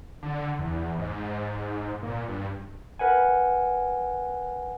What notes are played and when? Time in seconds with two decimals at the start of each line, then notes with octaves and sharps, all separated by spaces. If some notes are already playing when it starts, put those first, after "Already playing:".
0.23 D3
0.59 E2
0.99 G#2
2.03 A#2
2.28 G2
2.99 A#4 B4 F#5 G#5